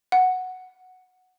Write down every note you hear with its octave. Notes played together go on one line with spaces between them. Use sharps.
F#5